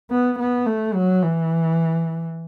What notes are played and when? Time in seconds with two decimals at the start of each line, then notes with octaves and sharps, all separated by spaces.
0.11 B3
0.39 B3
0.66 A3
0.94 F#3
1.22 E3